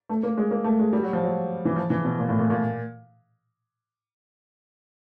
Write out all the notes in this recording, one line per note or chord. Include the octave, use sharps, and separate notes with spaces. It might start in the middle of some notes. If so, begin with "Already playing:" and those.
A3
A#3
G#3
A#3
A3
G#3
G3
F#3
F3
F#3
E3
F3
E3
B2
A#2
A2
A#2
A#2